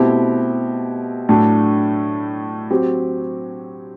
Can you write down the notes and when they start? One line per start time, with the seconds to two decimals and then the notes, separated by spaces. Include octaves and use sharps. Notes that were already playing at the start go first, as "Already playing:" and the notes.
Already playing: B2 A3 C4 E4 G4
1.29 A2 F#3 A3 D4
2.71 F#3 C4 G4